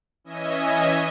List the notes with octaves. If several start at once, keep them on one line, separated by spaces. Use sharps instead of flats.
E3 C#4 D#5 E5 G#5